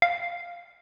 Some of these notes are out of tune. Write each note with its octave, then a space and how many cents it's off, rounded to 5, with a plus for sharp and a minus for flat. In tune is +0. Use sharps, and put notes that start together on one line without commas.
F5 +0